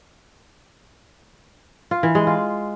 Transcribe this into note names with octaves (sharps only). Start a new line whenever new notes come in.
F4
E3
G#3
F4